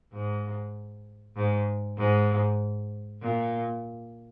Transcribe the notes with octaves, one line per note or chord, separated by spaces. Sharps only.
G#2
G#2
G#2
A#2